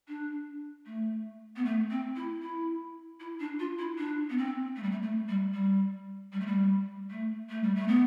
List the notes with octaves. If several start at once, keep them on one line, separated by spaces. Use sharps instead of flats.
D4
A3
B3
A3
C4
E4
E4
E4
D4
F4
E4
D4
B3
C4
A3
G3
A3
A3
G3
G3
G3
A3
G3
A3
A3
G3
A3
B3